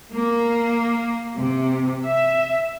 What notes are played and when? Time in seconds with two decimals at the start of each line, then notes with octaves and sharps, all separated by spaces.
0.14 A#3
1.37 C3
2.03 E5